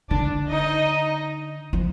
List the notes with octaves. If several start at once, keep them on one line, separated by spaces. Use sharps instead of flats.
D3 D4 D5
D#4 D#5
F3